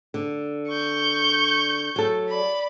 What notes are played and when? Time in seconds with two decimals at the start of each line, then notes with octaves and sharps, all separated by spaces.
0.14 D3
0.68 C#6 G6
1.96 F#3 A4
2.29 D5 B5